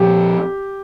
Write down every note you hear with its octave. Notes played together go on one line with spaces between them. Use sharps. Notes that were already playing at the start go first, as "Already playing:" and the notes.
Already playing: A#2 F3 C4 G4